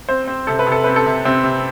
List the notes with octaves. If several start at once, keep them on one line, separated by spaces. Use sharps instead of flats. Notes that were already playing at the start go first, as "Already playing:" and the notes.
C4 C5
C4
C3 A4
B4
C3 A4
C4 B4
A4
C3
C3 C4
C3